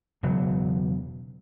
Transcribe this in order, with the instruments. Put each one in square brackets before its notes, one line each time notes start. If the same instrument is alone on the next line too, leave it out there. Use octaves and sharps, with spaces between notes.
[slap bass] E1 C#3 F#3